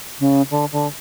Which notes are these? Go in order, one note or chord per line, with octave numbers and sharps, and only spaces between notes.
C#3
D3
D3